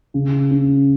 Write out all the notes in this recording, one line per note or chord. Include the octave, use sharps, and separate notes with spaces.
C#3
C#4